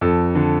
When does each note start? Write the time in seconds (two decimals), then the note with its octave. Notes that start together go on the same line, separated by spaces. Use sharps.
0.01 F2 A4
0.35 D3